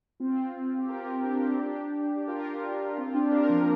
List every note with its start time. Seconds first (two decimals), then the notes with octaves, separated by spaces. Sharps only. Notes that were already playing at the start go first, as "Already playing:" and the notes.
0.20 C4 F4
0.79 G4
0.89 F4 A#4
1.24 D4 G4
1.58 D4 G4
2.17 G4
2.27 F4 A#4
2.97 C4 F4
3.14 D4 G4
3.32 F4 A#4
3.49 F3 A#3